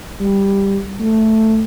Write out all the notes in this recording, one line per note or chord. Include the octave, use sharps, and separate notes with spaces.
G3
A3